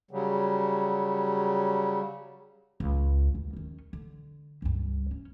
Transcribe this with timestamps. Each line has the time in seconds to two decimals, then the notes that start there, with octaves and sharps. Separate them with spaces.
0.11 C#3 F#3 G3
2.80 C#2
3.35 D#2
3.53 D#3 C#4
3.93 D3
4.62 C#2 G2
5.11 C#4